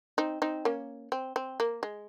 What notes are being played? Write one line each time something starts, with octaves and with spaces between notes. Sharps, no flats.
C4 D#4
C4 D#4
A#3 C#4
C4
C4
A#3
G#3